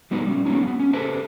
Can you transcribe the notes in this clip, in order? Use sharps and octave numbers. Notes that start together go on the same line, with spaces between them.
F#3 G3 B3 D#4 B4
G3 C#4
F#3 A#3 B3 C#4 D#4
A#3 B3
C#4
G4 A4 B4 C5 E5 A5